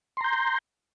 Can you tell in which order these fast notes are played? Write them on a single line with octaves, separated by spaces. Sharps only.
C6 A#5 G6